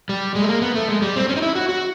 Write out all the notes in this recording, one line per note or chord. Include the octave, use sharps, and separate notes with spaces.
G3
G#3
A3
A#3
B3
A3
G#3
G3
C4
C#4
D#4
E4
F#4
F#4